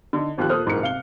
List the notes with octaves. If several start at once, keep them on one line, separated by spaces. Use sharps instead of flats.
D3 D#4
G#1 D#2 F3 G4 F#6
A#2 A4 C5 D#6 F6 F#6
D#1 G#2 E3 A#3 A#5 C#7
C3 F5 G7